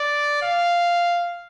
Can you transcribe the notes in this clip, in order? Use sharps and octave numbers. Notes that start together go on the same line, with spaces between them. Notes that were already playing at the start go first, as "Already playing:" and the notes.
Already playing: D5
F5